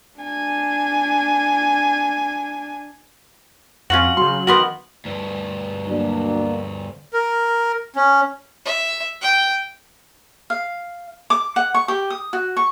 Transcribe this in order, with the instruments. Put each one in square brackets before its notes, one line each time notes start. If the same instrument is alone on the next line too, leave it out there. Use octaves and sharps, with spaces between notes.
[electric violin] D4 G#5
[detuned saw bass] F2 [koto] C#4 F4 F#4 [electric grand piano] F#5 [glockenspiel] F#7
[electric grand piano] C#3 C6 [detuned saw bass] F#3
[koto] D#3 B3 A#4 [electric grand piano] F#4 C6 [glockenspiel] F#7
[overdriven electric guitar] D2 G2
[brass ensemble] F#3 A#3 D4
[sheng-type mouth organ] A#4
C#4
[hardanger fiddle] E5
G5
[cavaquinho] F5
D6
F#5
C#6
G4
D#6
F#4
C#6